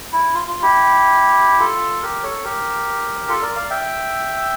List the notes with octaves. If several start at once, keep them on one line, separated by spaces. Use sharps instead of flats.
E4
F4
F4
E4 G4
F4 A4
G4 A#4
A4 C#5
G4 A#4
F4 A4
A#4 D5
D5 F5
E5 G5